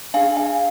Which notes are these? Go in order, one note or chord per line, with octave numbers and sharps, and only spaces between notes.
D4 G#4 F5 G#5
F5 G#5